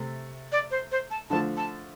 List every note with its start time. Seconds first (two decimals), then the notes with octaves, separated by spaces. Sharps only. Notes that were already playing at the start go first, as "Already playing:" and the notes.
Already playing: C3 A3
0.52 D5
0.71 C5
0.92 C5
1.11 A5
1.30 D3 F3 A3 A5
1.57 A5